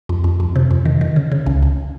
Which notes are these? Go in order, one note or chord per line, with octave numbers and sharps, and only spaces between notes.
F2
F2
F2
C3
F2
D#3
D#3
C#3
C#3
C#2
C#2